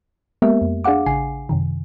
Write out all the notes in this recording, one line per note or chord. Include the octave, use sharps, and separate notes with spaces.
G#3 A#3 B3 G4 A#4 E5
F2
D4 G#4 F5 F#5 D6
A1 C#3 G#5 C7
F#2 C3 D#3